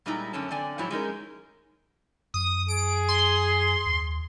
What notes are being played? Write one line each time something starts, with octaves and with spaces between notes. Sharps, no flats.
A#2 G3 G#3 D#4 E4 A#5
F#2 D3 A3 C#4 A5
D3 C4 D5 G#5
G#2 F3 F#3 E4 C#5
G#3 C#4 D#4 A#4
F#2 D#6
G#4 D7
C6
D#2